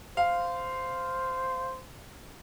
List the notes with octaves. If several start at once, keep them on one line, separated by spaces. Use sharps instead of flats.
C5 F5